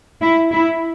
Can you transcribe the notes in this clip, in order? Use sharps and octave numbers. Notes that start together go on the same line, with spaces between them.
E4
E4